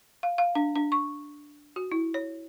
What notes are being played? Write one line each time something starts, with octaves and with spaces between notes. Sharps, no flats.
F5
F5
D4
D4
C#6
F#4
E4
C#5